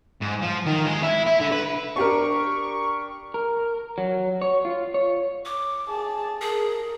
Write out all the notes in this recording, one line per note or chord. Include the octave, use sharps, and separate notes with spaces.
G#2
F3
D#3
G#3
E4
E4
D3
B4
D4 G4 A#4 C#6
A#4
F#3
C#5
F4
C#5
D6
G#4 A5
G#4 A#4